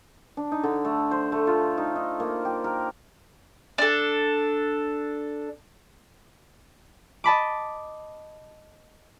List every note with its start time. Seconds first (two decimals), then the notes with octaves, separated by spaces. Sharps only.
0.37 D4
0.52 D#4
0.63 D3
0.85 A3
1.11 C5
1.32 A3
1.47 F4
1.77 D#4
1.96 D#4
2.20 A#3
2.45 G4
2.64 A#4
3.78 D4 A4
7.24 D#5 A5 B5 D6